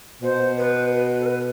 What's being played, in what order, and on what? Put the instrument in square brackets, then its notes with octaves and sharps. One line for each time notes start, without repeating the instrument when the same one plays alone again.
[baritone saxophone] B2 [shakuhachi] C5
[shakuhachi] B4
B4
A4
B4